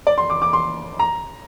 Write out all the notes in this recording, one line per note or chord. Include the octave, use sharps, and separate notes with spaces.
D5
C6
D6
D6
C6
A#5